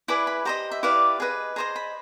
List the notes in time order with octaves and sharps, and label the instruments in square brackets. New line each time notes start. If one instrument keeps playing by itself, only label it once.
[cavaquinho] E4 G#4 B4 D5 B5
B5
G4 C5 D#5 A#5
E5
E4 G4 B4 D5 F5
G#4 B4 D#5
G#4 C5 D#5 A#5
B5